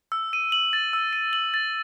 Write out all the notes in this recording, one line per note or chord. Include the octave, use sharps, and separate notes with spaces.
E6
D#7
F#7
A6
E6
D#7
F#7
A6